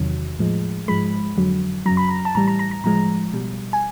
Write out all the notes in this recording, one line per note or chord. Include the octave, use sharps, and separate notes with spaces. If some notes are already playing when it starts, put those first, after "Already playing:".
Already playing: E2 C3 D#3 F#3
A2 F3 G#3
G#2 F3 G#3 B5
F2 D3 F#3
F#2 C#3 F#3 A#5
B5
A#5
A5
A2 E3 G3 A#5
A#5
A#5
A#5
A2 F3 G#3 A#5
B2 G3
G#5